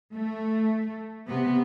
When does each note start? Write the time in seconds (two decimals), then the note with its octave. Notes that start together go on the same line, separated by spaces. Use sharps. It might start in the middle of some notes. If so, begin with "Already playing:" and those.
0.15 A3
1.27 C3 B3